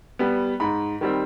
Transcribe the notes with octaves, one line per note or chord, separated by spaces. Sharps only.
G3 B3
G#2 B5
D#3 G3 C4